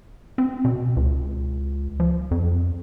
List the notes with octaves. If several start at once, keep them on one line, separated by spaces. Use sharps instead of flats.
C4
B2
C#2
F3
F2